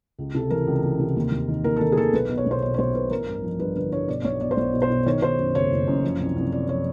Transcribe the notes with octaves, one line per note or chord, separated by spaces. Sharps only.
C#2
C3 A4
E3 A#4
C#2
E3
C3
D#2
D#2
D#3
D#2 A#4
A4
D#3 A#4
G#4
D#2 A4
B1 B4
B2
C#5
B1 C5
B2 C#5
C#5
B1 C5
B2 B4
A1 A#4
G2
F3
G2 B4
D3 B4
G2 C#5
B2 D5
D5
B1 C#5
B2 D5
C5
B1 C#5
B2
C5
B2
D#3 C#5
D#3 C5
F#2
F#1 C#5
F#1
F#2
F3
C2
C2
C2 D5
F3 C#5